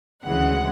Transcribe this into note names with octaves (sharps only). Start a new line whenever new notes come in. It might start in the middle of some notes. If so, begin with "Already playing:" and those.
D2 C#3 E3 G#3 F#5